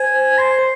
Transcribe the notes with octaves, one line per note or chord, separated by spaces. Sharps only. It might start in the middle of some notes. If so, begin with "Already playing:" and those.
Already playing: C5 G#5
C6